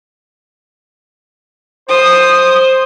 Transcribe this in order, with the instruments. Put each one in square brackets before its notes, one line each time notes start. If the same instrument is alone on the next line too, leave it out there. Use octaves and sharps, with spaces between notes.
[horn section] C5 [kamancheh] D#6